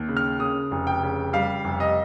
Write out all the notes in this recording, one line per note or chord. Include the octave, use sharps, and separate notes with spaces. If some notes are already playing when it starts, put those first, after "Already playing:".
Already playing: D#2
C#3
F6
C#3 D#6
F1
G5
C#3
G3 F5
F1
D#5